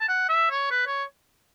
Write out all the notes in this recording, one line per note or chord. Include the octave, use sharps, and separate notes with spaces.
A5
F#5
E5
C#5
B4
C#5